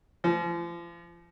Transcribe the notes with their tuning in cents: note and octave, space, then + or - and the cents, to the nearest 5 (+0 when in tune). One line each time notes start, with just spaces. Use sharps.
F3 -35